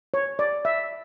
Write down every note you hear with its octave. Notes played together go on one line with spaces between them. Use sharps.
C#5
D5
E5